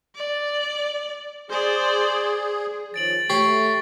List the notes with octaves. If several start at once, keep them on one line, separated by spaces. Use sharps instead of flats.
D5
G#4 C5 D5
D#3 F3 C#5 A6 D7 F#7
A3 G4 C#5 C#6 C7